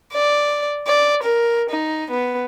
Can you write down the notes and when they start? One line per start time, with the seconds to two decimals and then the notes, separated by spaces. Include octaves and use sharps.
0.13 D5
0.87 D5
1.23 A#4
1.70 D#4
2.11 B3